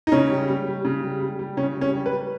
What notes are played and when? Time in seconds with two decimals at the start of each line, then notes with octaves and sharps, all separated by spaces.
0.07 D#4
0.12 C#3 C#4
0.30 G3
0.48 G3
0.67 G3
0.85 C#3
1.03 G3
1.20 G3
1.39 G3
1.57 C#3 C#4
1.75 G3
1.81 C#4
1.93 G3
2.06 B4
2.11 G3